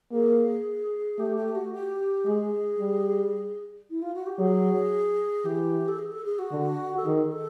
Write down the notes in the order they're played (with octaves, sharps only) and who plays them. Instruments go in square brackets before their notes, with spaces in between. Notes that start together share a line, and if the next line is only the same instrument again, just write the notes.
[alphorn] A#3 [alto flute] G#4
[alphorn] A3 [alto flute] G4
[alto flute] G4
F#4
G4
[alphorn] G#3 [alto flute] G#4
[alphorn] G3
[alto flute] E4
F4
F#4
G4
[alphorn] F#3 [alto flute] G#4
[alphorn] E3 [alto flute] G4
[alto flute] A4
G#4
A4
G#4
F#4
[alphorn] D3
[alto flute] A4
[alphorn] D#3 [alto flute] G#4
[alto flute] A4